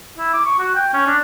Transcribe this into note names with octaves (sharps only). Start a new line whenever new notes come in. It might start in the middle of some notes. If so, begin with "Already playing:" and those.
E4
D6
C#6
F#4
G5
C#4
D4